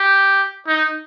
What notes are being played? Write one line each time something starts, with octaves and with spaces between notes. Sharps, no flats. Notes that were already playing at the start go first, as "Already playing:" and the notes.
Already playing: G4
D#4